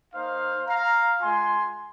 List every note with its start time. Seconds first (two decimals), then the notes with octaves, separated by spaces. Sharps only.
0.14 A#3 D#4 C5 F5
0.67 F5 A#5
1.20 G#3 F4 G#5 C6